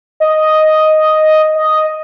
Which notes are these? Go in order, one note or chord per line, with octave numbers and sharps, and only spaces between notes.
D#5
D#5